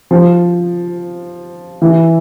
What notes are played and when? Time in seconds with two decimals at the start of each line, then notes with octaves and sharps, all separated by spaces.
0.11 F3
1.82 E3